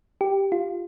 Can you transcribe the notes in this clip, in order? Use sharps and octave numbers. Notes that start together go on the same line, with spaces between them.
G4
F4